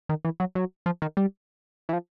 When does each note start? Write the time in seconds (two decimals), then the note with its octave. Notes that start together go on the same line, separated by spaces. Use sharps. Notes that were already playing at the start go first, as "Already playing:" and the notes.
0.09 D#3
0.25 E3
0.40 F#3
0.55 F#3
0.86 F3
1.02 D#3
1.17 G3
1.89 E3
1.93 F3